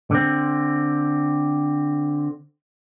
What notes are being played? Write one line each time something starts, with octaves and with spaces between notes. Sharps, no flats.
D3 C4